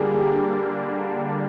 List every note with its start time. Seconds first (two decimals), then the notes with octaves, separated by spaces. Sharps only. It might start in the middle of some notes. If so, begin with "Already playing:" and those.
Already playing: D3 G3 A#3 D4 G4 G#4 A#4
0.14 G#4
0.19 G4